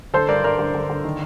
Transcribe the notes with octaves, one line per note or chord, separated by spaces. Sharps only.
D3 A4 C5
G2 A#4 D5
G2 A#4 D5
D3
D3
D3
D#3